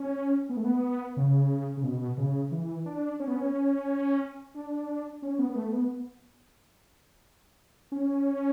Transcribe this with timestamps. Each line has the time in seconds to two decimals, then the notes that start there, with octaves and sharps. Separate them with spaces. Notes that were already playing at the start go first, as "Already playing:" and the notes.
Already playing: C#4
0.49 B3
0.57 A3
0.64 B3
1.17 C#3
1.77 C#3
1.84 B2
2.18 C#3
2.52 E3
2.86 D4
3.20 C#4
3.27 B3
3.36 C#4
4.55 D4
5.22 C#4
5.39 B3
5.50 B3
5.56 A3
5.72 B3
7.92 C#4